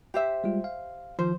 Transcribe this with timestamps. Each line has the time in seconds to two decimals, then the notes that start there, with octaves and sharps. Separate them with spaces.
0.14 G4 C5 E5
0.44 G3 G#3 F4
0.64 F5
1.19 D#3 F3 C5